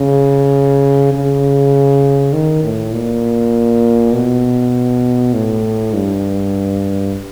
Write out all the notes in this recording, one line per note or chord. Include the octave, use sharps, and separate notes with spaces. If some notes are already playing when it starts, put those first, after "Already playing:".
Already playing: C#3
C#3
D#3
A2
A#2
B2
A2
G2